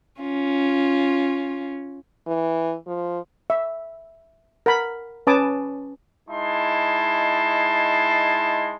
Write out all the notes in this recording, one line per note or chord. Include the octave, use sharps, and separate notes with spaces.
C#4 F4
E3
F3
E5
A#4 F#5 B5
C#4 B4 G#5 A5 D6 D#6
G#3 D#4 E4 A5 C6